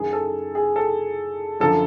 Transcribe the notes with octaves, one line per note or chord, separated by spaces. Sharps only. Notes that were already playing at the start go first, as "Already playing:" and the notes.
Already playing: F#2 D#3 G#4
A4
G#4
A4
F#2 D3 F3 A4